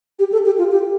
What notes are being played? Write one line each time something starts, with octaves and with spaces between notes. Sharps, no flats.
G4
A4
G4
F4
G4